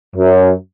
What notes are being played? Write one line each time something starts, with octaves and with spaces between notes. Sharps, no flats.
F#2